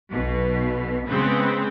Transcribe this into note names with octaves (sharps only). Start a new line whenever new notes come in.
B1 B2
C#3 G#3 B3 C4